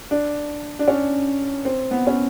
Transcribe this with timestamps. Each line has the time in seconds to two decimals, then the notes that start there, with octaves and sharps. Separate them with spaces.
0.11 D4
0.79 D4
0.88 C#4
1.65 C4
1.91 B3
2.07 C#4